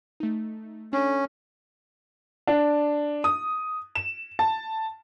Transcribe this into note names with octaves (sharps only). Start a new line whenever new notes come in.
A3 D#4
C#4 D4 A4
D4
D#6
E7
A5